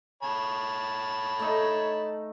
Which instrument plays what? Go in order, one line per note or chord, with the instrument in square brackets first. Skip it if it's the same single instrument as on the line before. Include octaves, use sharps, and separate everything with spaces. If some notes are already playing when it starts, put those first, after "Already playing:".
[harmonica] C#5 A5 B5
[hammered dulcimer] A3 D#4